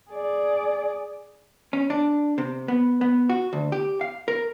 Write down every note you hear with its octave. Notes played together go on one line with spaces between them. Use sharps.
G#4 D5
C#4
D4
C3
B3
B3
F#4
D2
G4
F5
A#4